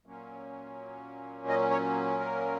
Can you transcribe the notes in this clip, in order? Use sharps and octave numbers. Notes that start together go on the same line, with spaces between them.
A#2 F#3 A#3 C#4
D#5
C#5
A#4